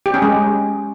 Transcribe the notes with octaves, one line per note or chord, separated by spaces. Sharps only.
G4
C#4
G#3